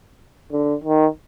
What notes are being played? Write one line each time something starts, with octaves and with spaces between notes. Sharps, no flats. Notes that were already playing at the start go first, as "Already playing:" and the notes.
D3
D#3